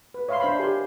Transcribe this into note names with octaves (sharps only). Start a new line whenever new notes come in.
B4
C#5 E5 F5 B5 C6
D4 C5 F5 B5
G4 A#4 G#5 C6